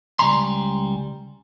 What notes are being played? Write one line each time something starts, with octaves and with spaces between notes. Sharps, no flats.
C#2 G3 G#3 G#5 A#5 C6